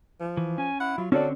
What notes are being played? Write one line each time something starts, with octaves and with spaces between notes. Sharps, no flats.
F3
E3
C#4 G#5
E4 F#5
F#3 F4
D3 C4 C#4 F#4 A4 D5